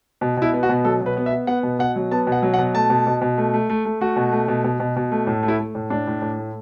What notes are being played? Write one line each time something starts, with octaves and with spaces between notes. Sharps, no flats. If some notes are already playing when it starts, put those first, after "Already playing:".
B2
B2 E4
B3
F#4
B2
F#3 A4
B2
B4
B3
E5
B3
B3 F#5
B2
B2 F#5
F#3
B3 A5
B2
F#5
F#3
F#5
B2
A3 A5
B2
B2
B2
A3
A3
A3
A3
A3 F#4
B2
A3
B2
B2
B2
B2
A3
A2
A3
E4
A3
A2
A2 D4
A2
A2
A3